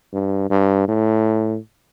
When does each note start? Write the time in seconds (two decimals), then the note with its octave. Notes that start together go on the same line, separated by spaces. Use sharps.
0.13 G2
0.50 G2
0.89 A2